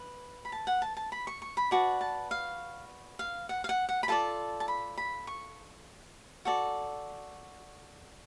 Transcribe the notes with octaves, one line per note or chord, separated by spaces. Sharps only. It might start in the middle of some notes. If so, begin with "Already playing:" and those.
Already playing: B4
B5
A5
F#5
A5
A5
B5
C#6
C#6
B5
F#4 B4 D5 A5
A5
F5
F5
F#5
F5
F#5
F#5
B5
F4 A4 D5 A5
A5
B5
B5
C#6
F#4 A4 D5